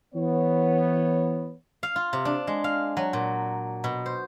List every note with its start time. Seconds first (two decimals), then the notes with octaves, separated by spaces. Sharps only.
0.15 E3 B3 C#5
1.83 F5
1.96 F4
2.13 C3
2.25 D4
2.47 G#3
2.64 F5
2.97 F#3
3.13 A#2
3.84 B2
4.06 C5